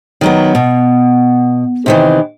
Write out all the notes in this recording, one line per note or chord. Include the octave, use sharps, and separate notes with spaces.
D#3 F#3 B3
B2
C3 D#3 E3